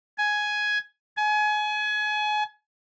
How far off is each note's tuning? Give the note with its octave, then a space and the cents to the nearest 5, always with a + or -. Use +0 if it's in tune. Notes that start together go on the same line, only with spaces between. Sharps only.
G#5 +10
G#5 +30